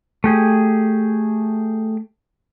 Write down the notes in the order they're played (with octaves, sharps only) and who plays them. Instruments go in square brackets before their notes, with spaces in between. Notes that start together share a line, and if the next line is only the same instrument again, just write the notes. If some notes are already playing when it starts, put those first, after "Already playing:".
[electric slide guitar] A3 G4 G#4